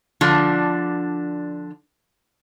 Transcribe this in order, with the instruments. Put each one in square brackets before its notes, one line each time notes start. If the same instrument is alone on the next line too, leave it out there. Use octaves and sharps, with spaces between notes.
[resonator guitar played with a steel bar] D3 F3 D4